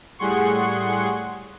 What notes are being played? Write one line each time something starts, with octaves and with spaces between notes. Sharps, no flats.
A2 G3 G#4 F#5 C6 C#6